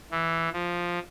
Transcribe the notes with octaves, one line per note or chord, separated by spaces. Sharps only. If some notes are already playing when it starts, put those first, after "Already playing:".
E3
F3